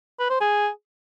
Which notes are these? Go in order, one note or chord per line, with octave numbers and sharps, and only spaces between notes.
B4
C5
G#4